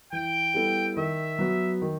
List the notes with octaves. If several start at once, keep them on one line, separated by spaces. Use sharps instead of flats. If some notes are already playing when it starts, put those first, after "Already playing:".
E3 G5
G3 B3 E4 A4
D#3 E5
F#3 B3
D#3